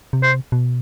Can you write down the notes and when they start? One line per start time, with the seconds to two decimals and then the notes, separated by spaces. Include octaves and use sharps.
0.13 C3
0.23 C5
0.52 B2